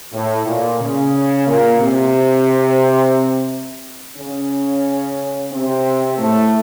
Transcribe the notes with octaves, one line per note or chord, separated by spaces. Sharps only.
A2
A#2
C#3
A#2 A#3
C3 C4
C#3 C#4
C3 C4
A2 A3